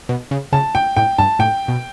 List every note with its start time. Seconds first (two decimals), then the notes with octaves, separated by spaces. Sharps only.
0.09 B2
0.31 C#3
0.52 C#3 A5
0.75 G5
0.96 A2 G5
1.18 G2 A5
1.39 A2 G5
1.68 B2